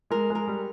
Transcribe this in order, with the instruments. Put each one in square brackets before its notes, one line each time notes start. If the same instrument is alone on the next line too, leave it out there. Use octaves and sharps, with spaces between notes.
[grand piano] G#3 [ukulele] A#4
[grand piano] G#3
[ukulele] A#4
[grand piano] G3